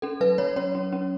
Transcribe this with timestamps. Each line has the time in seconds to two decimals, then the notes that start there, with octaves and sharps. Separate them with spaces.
0.02 C#4 A4
0.21 F#3 B4
0.38 F#3 C#5
0.56 C#4 C#5
0.75 C#4
0.93 C#4